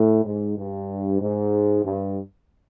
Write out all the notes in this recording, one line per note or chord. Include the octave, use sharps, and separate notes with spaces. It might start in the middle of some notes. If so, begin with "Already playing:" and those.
Already playing: A2
G#2
G2
G#2
G2